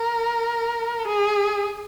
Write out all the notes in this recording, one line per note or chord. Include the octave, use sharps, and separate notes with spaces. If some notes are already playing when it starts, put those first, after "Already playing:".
Already playing: A#4
G#4